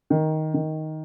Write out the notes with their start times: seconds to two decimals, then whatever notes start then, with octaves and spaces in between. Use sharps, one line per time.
0.10 D#3
0.54 D#3